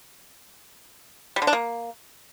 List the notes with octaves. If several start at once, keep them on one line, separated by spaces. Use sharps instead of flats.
G3
D3
D4
A#3